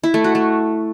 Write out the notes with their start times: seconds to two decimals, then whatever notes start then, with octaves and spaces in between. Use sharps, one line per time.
0.04 E4
0.14 A3
0.24 F#4
0.35 A3